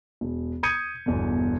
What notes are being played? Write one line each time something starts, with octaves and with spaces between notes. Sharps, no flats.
E1
D#6 G6 G#6 C#7 D#7
G1 E2 B2